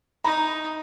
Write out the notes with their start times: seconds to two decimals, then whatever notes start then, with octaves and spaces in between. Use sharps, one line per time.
0.24 D#4 A#5